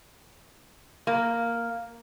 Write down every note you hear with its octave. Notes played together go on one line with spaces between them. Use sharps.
A#3